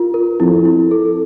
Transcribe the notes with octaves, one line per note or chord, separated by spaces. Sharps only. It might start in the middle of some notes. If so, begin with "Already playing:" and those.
Already playing: F4 A#4
A#4
F2 E4
E4
A4